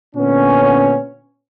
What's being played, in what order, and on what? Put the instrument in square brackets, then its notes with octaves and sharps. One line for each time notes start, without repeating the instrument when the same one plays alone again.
[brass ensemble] A#2 D3 B3 C#4